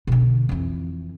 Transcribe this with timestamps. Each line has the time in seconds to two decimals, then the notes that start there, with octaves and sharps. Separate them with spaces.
0.07 B2 D3
0.49 F2 E3